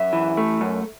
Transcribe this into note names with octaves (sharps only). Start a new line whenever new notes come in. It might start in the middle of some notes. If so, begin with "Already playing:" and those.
Already playing: F#2 E5
E3
A3
F#2